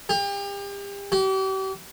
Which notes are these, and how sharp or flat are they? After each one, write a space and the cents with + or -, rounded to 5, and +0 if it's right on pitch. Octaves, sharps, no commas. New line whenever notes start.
G4 +35
G4 -40